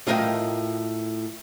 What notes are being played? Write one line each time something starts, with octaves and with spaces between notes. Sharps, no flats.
A2 F4 A#4 D#5 F#5 G5